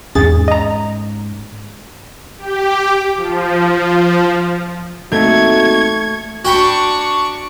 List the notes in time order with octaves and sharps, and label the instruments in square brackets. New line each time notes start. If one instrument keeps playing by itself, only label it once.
[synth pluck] E2 G#4 A6 [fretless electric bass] G#2 C#4
[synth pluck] D#5 A#5
[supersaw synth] G4
F3
[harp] A3 [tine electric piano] A#3 C4 D#4 [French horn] F#4 [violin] C#6 G#6
[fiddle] D4 C#6 [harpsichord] F#4 G5 B5